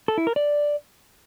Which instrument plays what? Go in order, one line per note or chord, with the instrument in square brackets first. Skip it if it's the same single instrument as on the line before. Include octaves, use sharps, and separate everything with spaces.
[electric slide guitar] A4
E4
A#4
D5